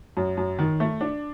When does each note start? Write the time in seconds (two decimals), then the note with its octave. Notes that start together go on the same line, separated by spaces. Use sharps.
0.17 F#2
0.37 F#2
0.59 D#3
0.80 A3
1.01 D4